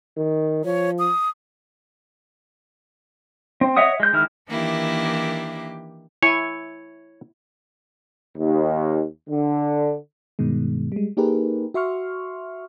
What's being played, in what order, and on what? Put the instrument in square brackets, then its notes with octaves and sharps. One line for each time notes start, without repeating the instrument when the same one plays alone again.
[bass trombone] D#3
[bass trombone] F3 [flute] C#5
[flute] D#6
[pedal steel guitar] C4
C#5 D#5 E5 F#5 D#6
G#3 G6
D#3 G#3 E4 F6
[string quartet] D#3 E3 A#3 D4 E4 G4
[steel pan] E4 G#5 C#6 [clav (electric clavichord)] C#5
[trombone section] D#2
D3
[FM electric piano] G2 B2 D#3 G#3
G3 G#3
A#3 D#4 G4 G#4 A#4 B4
F#4 E5 C6 C#6 F6